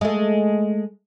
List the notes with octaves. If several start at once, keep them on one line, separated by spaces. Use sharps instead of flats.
G#3 A3